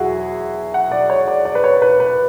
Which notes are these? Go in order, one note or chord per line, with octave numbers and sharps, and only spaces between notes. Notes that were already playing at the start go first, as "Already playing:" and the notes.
Already playing: E2 F#3 E4 F#4 G#4
F#5
D5
C#5
D5
D5
B4
C#5
B4
B4